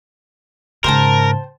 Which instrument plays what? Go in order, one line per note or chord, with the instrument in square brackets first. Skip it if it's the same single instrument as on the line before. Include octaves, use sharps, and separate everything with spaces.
[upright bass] G#2 C#3 [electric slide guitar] A#4 [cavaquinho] C5 G5 A5